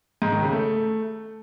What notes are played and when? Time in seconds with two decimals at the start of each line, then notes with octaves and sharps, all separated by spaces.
0.22 G#2
0.32 D#3
0.42 C#3
0.52 A3